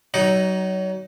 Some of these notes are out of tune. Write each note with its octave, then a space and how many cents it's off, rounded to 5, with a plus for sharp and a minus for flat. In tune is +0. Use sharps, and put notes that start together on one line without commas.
F#3 +30 D#4 +0